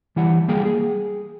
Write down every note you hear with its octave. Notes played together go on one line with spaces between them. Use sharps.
E3 G3 E4 F#5
G3 A#3 G#4 G5
G#4